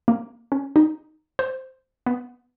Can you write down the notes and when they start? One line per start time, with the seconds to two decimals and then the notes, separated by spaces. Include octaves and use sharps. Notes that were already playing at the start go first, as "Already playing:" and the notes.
0.08 A#3
0.52 C#4
0.76 D#4
1.39 C5
2.06 B3